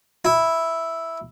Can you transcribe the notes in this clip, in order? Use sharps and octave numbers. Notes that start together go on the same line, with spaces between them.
E4